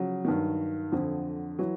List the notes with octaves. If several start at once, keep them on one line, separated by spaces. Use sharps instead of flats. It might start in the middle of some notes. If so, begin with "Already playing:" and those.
Already playing: C#3 F3 F#3
G2 D#3
F2 D3 F3
E3 F#3